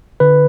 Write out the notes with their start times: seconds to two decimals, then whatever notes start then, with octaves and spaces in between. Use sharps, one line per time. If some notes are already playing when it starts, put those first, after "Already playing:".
0.20 D3 B4